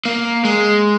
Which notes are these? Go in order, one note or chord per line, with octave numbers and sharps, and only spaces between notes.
A#3
G#3